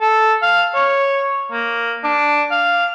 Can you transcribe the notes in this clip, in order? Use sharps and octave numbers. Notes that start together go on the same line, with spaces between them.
A4
F5
C#5
A#3
D4
F5